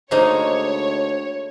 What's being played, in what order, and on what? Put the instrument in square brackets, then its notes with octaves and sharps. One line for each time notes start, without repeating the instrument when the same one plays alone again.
[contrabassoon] D2 [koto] G#3 A#3 D#4 [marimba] C5 [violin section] C#5